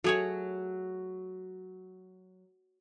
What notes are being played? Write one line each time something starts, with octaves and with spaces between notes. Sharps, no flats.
F#3 A3 G#4 C#5